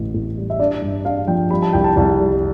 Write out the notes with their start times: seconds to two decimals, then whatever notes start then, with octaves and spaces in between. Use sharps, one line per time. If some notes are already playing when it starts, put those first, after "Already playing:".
Already playing: A1 A2
0.14 A2
0.37 G3
0.50 E5
0.59 D4 D5
0.82 G2
1.05 D4 F5
1.27 F3 G5
1.50 G3 B5
1.62 A5
1.73 C2 G5
1.84 A5
1.96 C2 A5
2.19 G3